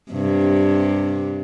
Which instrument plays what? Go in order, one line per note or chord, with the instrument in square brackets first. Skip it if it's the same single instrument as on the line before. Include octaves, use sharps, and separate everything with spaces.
[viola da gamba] G2 C3